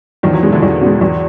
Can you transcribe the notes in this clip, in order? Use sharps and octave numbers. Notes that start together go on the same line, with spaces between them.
E2 D#3 F3
E3 F#3
B2 G#3
D3 E3
E2
B2
G#3
E2